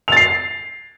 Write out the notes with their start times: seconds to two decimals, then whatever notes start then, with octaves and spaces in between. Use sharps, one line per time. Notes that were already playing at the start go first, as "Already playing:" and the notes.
0.08 F7
0.12 A6
0.17 C7